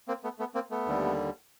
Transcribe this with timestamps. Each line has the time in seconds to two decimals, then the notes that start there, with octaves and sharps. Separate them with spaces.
0.08 A#3 C4
0.24 A3 B3
0.39 A3 B3
0.55 A#3 C4
0.71 A3 B3
0.86 D#2 D3 G3